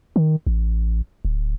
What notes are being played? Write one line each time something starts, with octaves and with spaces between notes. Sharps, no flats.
D#3
A1
D1